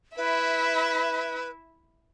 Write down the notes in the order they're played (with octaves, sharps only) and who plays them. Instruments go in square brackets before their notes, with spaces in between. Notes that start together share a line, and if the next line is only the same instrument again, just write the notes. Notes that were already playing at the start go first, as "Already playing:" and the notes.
[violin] E4 E5 [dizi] B4